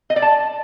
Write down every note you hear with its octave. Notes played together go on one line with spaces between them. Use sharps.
D#5
D5
A5